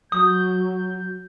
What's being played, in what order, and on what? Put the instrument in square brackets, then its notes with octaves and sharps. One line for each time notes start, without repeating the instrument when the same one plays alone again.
[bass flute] F#3 [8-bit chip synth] D#6 [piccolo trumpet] G6